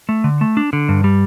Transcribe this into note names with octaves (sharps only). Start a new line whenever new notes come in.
A3
D3
A3
D4
D3
G2
G3